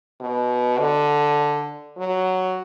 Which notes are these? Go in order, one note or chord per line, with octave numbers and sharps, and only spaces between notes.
B2
D3
F#3